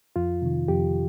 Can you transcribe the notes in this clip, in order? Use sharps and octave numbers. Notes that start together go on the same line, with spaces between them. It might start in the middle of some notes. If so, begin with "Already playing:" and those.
F2 F4
C3 D#3
F2 G4